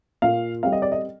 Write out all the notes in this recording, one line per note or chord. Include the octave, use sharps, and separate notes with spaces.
A#2 F5
G3 C4 F5
D#5
D5
D#5